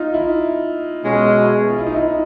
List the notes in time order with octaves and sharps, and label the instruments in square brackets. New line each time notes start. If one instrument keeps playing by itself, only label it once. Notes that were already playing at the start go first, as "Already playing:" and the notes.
Already playing: [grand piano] D#4 F4
E4
[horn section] B2 G#3 C#4
[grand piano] F4
E4
D#4
E4